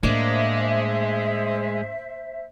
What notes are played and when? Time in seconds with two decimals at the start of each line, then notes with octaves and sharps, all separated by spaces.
0.03 A2 G#3 A#3 D4 C5 E5